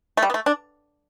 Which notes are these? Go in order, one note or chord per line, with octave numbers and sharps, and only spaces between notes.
A3
G3
B3
A3
D4